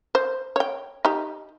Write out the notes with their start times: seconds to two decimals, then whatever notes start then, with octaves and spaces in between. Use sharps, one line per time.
0.15 C5
0.56 C#5 G5
1.05 D#4 G4